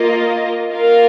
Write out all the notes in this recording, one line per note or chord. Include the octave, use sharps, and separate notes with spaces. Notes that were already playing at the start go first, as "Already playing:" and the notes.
Already playing: A#3 F4 A#4 D#5
A#3 F4 A#4 F5